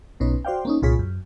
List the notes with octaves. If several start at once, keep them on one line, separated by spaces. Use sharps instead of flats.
B1 B2 C#4 D#4 B4
F#4 C5 D5 F5 G5
A#3 C#4 D#4
C2 A#2 F4 G#4 C#5 B6
F#2